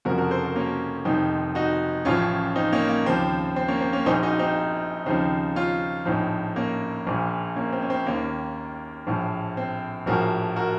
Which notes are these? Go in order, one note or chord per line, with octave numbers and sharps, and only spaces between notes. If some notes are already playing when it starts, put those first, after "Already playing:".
F1 F2 C#3 F3 F#4 A#4
F#4 A#4
A4 C5
F#4 A#4
A#3 C#4
F1 F2 D#3 C4 D#4
D#4 F#4
A1 A2 F3 C#4 F4
C4 D#4
A#3 C#4
A#3
D#2 C#3 F3 C4
C4
A#3 C#4
C4
A#3 C#4
A#1 A#2 F3 C4 D#4
D#4 F#4
C4 D#4
D#2 C#3 F3 C4 D#4
C#4 F4
A#1 A2 F3 C4 D#4
A#3 C#4
A#1 A#2 F3
A#3 C#4
C4
C#4
C4
D#2 D#3 A#3 C#4
A#1 A2 F3
C4
A#1 A2 F3 F#4 A#4
F#4 A#4